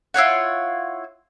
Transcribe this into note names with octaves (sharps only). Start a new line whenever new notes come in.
E4 F4 C#5 F#5